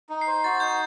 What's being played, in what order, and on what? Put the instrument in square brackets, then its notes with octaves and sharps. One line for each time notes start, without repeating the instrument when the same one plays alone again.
[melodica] D#4
[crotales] C7
[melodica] C5
[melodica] F#4 [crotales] A6
[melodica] D#4 [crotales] G6